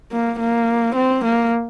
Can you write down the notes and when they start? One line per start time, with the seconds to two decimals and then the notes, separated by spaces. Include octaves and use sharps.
0.12 A#3
0.39 A#3
0.95 C4
1.25 A#3